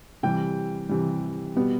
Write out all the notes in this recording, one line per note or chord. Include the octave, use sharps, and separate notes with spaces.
C3 E3 G3 G5
C3 E3 G3
B2 G3 B3